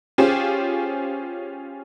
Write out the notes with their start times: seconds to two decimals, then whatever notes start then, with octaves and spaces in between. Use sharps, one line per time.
0.18 C#4 F4 G4 G#4 C5